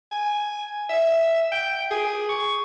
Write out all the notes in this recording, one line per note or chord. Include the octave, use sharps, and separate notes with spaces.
G#5
E5
G5
G#4
C#6